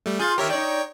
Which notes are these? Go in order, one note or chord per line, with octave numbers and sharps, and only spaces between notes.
G3 A3
F4 G#4 G6 A6
D#3 G4 A#4 C#5 E5
D#4 C#5 D5 G5